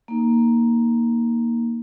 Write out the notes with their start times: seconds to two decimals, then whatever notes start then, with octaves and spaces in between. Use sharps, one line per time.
0.08 A#3 D#4